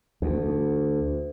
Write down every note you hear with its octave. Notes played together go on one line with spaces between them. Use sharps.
D2